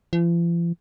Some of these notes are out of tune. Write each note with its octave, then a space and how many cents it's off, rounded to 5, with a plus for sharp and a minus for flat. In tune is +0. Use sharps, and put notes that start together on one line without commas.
F3 -45